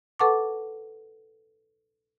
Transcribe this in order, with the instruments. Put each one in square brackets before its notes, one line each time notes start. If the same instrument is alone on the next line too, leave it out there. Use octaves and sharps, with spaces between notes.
[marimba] A4 B4 F#5 A5 C#6 D6